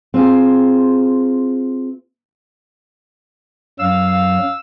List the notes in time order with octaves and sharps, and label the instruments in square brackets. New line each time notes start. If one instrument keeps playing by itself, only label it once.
[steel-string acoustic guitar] C4 F4 G#4
[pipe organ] F#2 F#3 [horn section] F5 [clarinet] E6